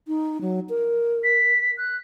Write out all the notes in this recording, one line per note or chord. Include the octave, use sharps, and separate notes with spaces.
D#4
F#3
A#4
B6
F#6